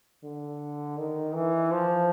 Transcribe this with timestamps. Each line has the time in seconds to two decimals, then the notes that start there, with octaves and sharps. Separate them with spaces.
0.24 D3
0.98 D#3
1.34 E3
1.71 F3